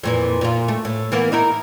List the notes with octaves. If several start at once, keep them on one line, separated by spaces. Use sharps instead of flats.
F2 A#2 E3
A#2 F4
A3
A2
E3 A#3 B3
D#4 E4 A#4